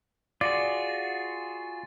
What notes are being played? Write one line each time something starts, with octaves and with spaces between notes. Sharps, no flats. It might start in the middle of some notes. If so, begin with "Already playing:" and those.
F4 F#4 G#4 D5 A6